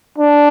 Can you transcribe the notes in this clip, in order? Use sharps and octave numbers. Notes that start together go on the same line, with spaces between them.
D4